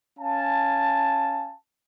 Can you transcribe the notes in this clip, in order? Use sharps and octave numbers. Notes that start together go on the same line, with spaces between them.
C#4 F5 G#5 A5